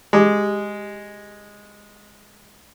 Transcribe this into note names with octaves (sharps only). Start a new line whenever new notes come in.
G#3 G4 A#5 D6